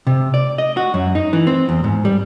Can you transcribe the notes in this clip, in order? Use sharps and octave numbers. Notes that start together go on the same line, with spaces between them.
C3
D5
D#5
F#4
F#2
D#4
E3
C4
E2
G#2
G3